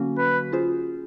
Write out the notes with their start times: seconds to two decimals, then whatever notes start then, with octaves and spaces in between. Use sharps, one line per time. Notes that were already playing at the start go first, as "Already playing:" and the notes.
Already playing: D3 F#3 A#3 C#4 F#4
0.18 B4
0.52 C#4 F4 G#4 C5